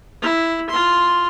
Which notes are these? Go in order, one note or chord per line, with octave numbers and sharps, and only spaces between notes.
E4
F4 C6